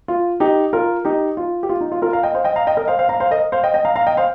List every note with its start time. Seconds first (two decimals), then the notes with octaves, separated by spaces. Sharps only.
0.08 F4
0.40 D#4 G4
0.73 F4 A#4
1.05 D#4 G4
1.37 F4
1.63 G4
1.69 F4
1.81 D#4
1.92 F4
2.02 F4 A#4
2.13 F5 A#5
2.23 D#5 G5
2.34 C5 F5
2.45 D#5 G5
2.56 F5 A#5
2.67 D#5 G5
2.77 A#4 D#5
2.88 C5 F5
2.99 C5 F5
3.09 F5 A#5
3.20 C5 F5
3.31 A#4 D#5
3.52 C5 F5
3.63 D#5 G5
3.74 D#5 G5
3.85 F5 A#5
3.96 F5 A#5
4.07 D#5 G5
4.17 C5 F5